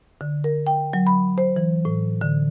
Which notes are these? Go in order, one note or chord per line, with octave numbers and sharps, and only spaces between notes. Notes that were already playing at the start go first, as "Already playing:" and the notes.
D3
A#4
G5
F#3
B5
C5
E3
A2
D3